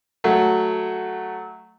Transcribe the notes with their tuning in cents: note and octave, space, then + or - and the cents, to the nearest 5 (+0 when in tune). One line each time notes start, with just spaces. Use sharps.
F#3 +0 A3 +0